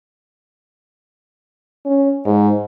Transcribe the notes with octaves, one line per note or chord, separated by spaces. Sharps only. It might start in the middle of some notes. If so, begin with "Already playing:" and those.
C#4
G#2